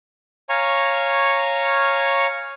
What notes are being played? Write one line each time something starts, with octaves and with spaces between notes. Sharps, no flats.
C#5 F5 G#5 A#5 C#6